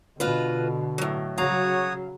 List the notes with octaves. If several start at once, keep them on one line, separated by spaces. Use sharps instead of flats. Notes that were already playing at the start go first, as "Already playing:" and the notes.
B2 D3 F4 F#4 B4
A2 F#3
C#3 F#3 F#4 C#5 F5 A#5 D#6